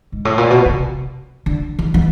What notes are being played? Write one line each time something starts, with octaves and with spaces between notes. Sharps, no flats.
G#2
A2
A#2
B2
C3
D3
D#3
E3